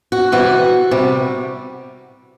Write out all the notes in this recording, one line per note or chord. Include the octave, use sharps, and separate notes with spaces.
F#4
C3 E3 G3 F#4
C3 G3